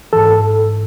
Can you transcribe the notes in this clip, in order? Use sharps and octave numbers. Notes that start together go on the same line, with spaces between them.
G#2 E3 A4